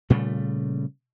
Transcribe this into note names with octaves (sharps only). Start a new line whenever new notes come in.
A#2 C#3 G3 A3